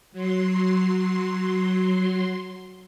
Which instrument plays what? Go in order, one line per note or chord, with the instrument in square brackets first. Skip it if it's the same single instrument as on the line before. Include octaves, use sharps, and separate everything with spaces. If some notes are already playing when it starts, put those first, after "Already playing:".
[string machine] F#3 C6